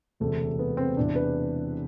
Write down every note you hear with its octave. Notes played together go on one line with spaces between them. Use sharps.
E1 D2 C3 A3
B3
C4
E1 E2 C3 E3 D4
B4